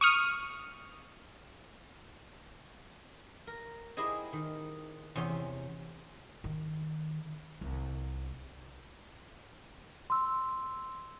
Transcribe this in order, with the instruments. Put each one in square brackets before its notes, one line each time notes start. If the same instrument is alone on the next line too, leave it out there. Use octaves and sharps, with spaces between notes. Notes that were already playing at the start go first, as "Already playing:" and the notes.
[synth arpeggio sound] C#6 D#6 F6
[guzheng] A#4
E4 G4 G#4 C5 D#5
D#3
E2 C3 C#4 G5
[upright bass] D#3
C2
[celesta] C6 E6